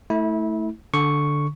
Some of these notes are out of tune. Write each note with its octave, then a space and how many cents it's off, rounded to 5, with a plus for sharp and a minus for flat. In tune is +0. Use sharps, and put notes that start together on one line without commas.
A3 +0 E4 -25
D3 +0 C#6 +0